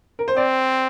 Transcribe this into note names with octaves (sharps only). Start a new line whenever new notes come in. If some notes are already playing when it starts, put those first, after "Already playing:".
A#4
C5
C4 D5